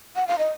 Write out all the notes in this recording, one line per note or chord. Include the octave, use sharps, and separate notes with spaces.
F#5
F5
D#5